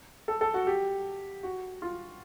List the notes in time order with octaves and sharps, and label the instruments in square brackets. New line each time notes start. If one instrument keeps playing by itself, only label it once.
[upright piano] A4
A4
F#4
G4
F#4
F4